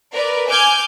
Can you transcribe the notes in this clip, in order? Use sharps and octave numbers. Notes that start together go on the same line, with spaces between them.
A#4 B4 D5
G#5 D6 F6 G6 G#6